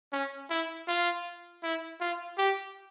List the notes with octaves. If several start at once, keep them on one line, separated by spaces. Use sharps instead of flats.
C#4
E4
F4
E4
F4
G4